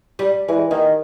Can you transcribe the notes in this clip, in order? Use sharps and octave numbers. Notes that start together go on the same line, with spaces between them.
G3
E3 G#3
D#3 A#3